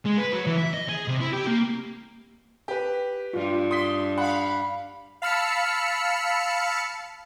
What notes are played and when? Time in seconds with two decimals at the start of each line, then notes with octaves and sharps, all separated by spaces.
0.05 G#3
0.17 B4
0.33 F#3
0.47 E3
0.58 E5
0.74 D#5
0.89 G#4
1.08 C3
1.21 E4
1.33 G4
1.47 A#3
2.68 G4 B4
3.34 G2 F4
3.71 C6 D#6 B6
4.18 F5 F#5 B5
5.22 F5 A5 B5 E6 F6 C#7